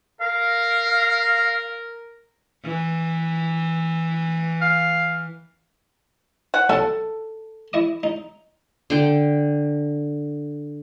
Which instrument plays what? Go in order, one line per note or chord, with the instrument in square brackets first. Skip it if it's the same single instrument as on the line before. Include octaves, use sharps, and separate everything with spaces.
[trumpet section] A#4 [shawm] F5
[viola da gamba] E3
[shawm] F5
[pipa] F#5
[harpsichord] B1 F#5 [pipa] A4
[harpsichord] E4 D#5 D#6
D#4
[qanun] D3 G5